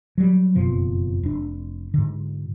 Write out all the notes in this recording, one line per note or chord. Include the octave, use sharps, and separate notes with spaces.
F#3 G3
F#1 F2 B2 F3
F1 D4
G#2 D3